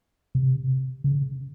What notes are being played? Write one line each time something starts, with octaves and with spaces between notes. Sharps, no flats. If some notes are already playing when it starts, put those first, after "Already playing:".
C3
C#3